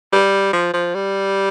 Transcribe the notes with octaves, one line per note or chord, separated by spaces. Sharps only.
G3
F3
F3
G3